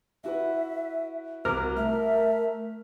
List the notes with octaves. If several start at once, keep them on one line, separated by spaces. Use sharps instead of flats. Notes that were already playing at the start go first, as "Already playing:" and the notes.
E4 F#4 B4 E5
C2 F#4 A#4 D6 F6
A3 E5 F6